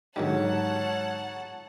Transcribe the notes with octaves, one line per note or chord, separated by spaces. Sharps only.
G#2 D3 D#3 F#3 G3 C#5 F#5 A5